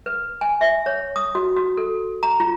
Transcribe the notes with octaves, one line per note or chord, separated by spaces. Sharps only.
B4
G#5
E5
C#5
D#6
F#4
F#4
A4
A#5
F4